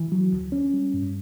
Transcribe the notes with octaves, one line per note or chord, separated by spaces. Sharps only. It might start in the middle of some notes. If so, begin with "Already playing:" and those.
Already playing: E3
F#3
D2
C#4
G3
G2